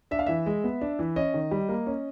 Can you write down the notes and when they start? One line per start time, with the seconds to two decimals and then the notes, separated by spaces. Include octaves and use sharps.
0.11 D4 E5
0.19 F5
0.26 E3 E5
0.46 G#3
0.64 B3
0.81 D4
0.99 E3
1.16 C#4 D#5
1.34 D#3
1.51 G3
1.69 A#3
1.87 C#4